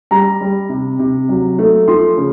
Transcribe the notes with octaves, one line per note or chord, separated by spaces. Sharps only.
G3 A#5
G3
C3
C3
F#3
A3
F3 C6
C#3